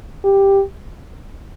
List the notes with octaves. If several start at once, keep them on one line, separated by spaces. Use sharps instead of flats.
G4